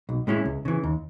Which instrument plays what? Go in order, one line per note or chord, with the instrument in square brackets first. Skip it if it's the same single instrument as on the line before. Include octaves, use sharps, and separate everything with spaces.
[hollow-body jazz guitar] B1
A2 G#3 C#4 E4
C#2
C#3 E3
D#2